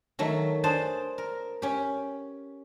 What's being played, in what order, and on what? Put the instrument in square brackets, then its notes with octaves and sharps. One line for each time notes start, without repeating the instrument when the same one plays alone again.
[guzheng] D#3 F#3 A3
D4 G#4 C5 A5
A#4
C#4 G4